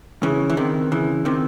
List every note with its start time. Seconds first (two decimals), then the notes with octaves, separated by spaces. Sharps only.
0.23 C#3 E3
0.50 E3
0.57 C3 D#3
0.92 C#3 E3
1.25 C3 D#3